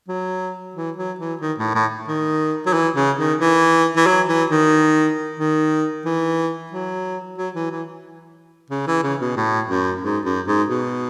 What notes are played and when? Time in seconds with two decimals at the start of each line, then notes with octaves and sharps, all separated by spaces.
0.08 F#3
0.75 E3
0.97 F#3
1.19 E3
1.41 D#3
1.58 A2
1.74 A2
2.08 D#3
2.66 F#3
2.73 E3
2.96 C#3
3.18 D#3
3.40 E3
3.96 E3
4.06 F#3
4.28 E3
4.50 D#3
5.39 D#3
6.05 E3
6.71 F#3
7.38 F#3
7.55 E3
7.71 E3
8.70 C#3
8.87 E3
9.03 C#3
9.21 B2
9.37 A2
9.70 F#2
10.03 G#2
10.25 F#2
10.47 G#2
10.69 B2